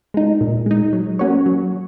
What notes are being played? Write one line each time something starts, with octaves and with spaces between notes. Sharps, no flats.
G#3 D#4
A#2
G#3 D#4
F#3
A#3 C#4 F#4 C#5
F#3